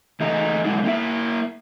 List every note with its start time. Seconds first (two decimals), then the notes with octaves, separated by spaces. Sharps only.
0.20 E3 A3 G#4 D#5 A#5
0.65 B2 D3 F#3 G#3 D4 E4
0.84 A#3 E4 A4 E5